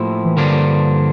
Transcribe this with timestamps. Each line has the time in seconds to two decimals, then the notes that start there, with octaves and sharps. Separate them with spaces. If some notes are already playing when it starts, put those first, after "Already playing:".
Already playing: A2 F3 A#3 E4
0.25 E3
0.37 G2 D3 F3 A#3 D4